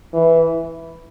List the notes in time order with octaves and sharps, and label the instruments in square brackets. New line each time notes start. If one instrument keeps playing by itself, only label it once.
[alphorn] E3